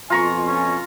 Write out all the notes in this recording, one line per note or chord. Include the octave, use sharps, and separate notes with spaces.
F2 B2 F4 G#5 A#5 C#6
C#4